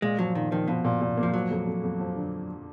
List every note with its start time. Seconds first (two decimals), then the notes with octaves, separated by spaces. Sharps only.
0.02 A#2 G#3
0.19 F3 F#3
0.35 A#2 D#3
0.52 D#3 F3
0.68 B2 F3
0.85 A#2
1.01 A#2
1.17 A#3
1.23 F3
1.34 F3 F#3
1.51 F2
1.66 F2
1.84 F2
2.00 F3
2.16 D3